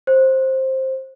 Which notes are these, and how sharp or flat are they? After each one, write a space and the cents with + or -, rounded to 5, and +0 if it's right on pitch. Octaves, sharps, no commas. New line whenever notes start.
C5 +15